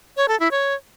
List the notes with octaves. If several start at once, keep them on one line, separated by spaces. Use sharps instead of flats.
C#5
A4
E4
C#5